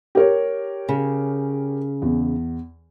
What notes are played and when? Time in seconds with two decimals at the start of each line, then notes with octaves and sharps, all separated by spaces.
0.15 G4 A#4 C#5
0.89 C#3
2.02 E2